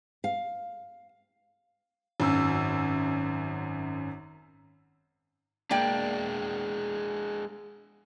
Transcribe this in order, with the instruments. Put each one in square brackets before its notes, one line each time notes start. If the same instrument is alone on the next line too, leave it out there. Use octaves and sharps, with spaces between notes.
[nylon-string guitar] F5
[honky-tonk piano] G#1 F#2 E6
[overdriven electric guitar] G#3 D4 [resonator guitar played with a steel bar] A#3 D5 G5